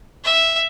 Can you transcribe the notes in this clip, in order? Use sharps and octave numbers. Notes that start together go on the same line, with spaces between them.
E5